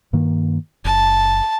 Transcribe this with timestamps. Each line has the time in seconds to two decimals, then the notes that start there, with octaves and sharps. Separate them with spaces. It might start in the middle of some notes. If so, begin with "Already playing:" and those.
0.13 G2 D#3 A#3
0.85 F#1 A5